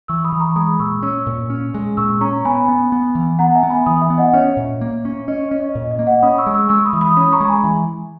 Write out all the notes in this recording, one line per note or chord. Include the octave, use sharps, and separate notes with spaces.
E3 C#6 E6
B5 D#6
E3
A#5 C#6
G#3 B5 D#6
A#2 C#6 E6
C#4 C#6 E6
A#2
C#4
G#3
A#2 C#6 E6
C#4 A#5 C#6
B3 G#5 B5
B3
B3
E3
B3 F#5 A#5
E5 G#5
B3
G#5 B5
E3 B5 D#6
E5 G#5
B3
D#5 F#5
C#4 C#5 E5
A#2
A#3
C#4
C#4 D#5
D#5
C#4
D#5
A#2 D#5
D#5
A#3
D#5 F#5
C#4 B5 D#6
C#6 E6
G#3
C#6 E6
G#3 C#6 E6
B5 D#6
E3
B5 D#6
C#4 B5 D#6
A#5 C#6
G#3
G#5 B5
E3